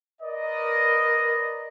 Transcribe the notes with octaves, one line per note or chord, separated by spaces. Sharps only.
A#4 B4 D5 D#5